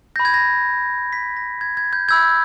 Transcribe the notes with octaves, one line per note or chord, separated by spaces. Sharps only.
B5 G6 A#6
G#6
A#6
B6
A#6
G#6
G#6
G6
B5 E6 G6 G#6